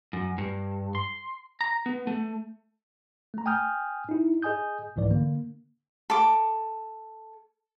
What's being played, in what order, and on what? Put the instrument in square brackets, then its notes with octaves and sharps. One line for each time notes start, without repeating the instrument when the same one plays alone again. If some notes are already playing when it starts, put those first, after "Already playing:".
[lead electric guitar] F#2
G2
C6
A#5
B3
A3
[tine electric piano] A3 A#5
G5 G#5 D#6 F6 G6
D#4 E4
G#4 D#5 G#5 D#6 G6
C2 G#2 E3 D5
D3 A#3
[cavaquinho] A4 D6